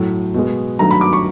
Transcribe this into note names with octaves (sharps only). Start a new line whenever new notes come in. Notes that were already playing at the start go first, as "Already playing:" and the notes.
Already playing: A2 F#3 A3
B2 G#3
G2 D#3 F#3 A3 A#5
B5
D6
C#6